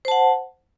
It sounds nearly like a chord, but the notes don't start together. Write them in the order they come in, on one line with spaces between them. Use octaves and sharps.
C5 A5 F#5